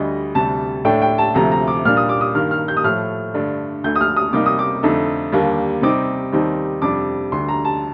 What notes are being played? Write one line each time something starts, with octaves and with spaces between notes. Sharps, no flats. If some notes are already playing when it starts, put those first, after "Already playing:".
Already playing: D2 D3 G3 D#5
D2 C3 G3 A5
A2 A3 D4 G5
G5
A5
D2 C3 F3 A3 A#5
A#5
D6
A#2 G3 A#3 D4 F6
D#6
D6
D#6
G2 D#3 A#3 F6
F6
G6
D#6
A2 F3 A3 F6
G2 D3 A3 D4
D2 D3 A3 G6
D#6
F6
D#6
C3 G3 A#3 D#4 D6
D#6
D6
F2 D3 A3 D#4
D#2 D3 G3 A#3
C3 G3 C4 D#4 D6
D#2 D#3 G3 C4 D#4
F2 C3 G3 D4 D6
D2 D3 G3 C6
A#5
A5